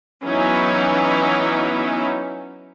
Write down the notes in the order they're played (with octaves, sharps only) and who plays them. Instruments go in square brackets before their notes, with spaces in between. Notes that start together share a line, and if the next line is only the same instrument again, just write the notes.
[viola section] E3 F#3 B3 C#4 D#4 E4